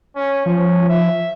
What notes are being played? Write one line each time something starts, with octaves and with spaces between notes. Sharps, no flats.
C#4
F3 C#4
E5